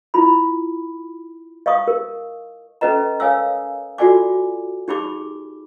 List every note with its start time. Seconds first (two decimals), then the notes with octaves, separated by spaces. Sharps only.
0.14 E4 F4 B5
1.66 D#5 F5 C#6 D#6
1.87 A#4
2.81 C#4 A4 B4 D#5 A#5
3.20 A#4 C#5 F5 G#5 D#6 E6
3.98 F4 F#4 A4 D5 G#5 D6
4.88 D#4 G4 G#4 B5 D6